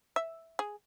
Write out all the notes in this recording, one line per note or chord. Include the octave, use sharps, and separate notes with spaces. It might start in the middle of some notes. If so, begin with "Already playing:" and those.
E5
G#4